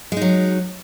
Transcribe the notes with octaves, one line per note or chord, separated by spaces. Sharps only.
F#3 G#3 D#4